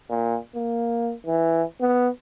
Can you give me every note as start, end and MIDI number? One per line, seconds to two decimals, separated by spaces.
0.10 0.38 46
0.56 1.13 58
1.26 1.63 52
1.81 2.09 59